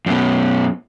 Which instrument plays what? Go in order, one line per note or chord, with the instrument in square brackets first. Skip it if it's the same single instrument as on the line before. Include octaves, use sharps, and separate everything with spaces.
[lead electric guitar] F#2 B2